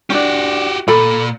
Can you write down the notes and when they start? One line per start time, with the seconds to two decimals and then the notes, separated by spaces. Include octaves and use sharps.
0.10 C#4 D4 F#4 G4
0.88 A#2 A4 B5